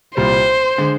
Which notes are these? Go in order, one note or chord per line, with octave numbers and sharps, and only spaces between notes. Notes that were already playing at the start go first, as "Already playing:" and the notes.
C2 A#2 G3 C5
D3 G#3